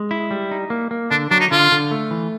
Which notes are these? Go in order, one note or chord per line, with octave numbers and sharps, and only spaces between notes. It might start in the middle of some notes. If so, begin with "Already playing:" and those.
Already playing: G#3
E4
G3
D#4
A#3
A#3
D3 D4
F#3 D4
D#4
D3 F4
D3
A3
E3